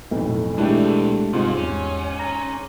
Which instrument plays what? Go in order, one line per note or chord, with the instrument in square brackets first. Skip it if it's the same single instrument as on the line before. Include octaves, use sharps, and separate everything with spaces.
[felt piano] B1 F2 A2
[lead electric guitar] B2 E3 [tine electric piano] G#3 [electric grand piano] A3 D4 [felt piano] E4 G4 G#4
[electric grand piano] G#2 [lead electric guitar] C3 G3 [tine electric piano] G#3 C4 F4
[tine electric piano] E2 [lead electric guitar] C#4
[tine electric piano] A#5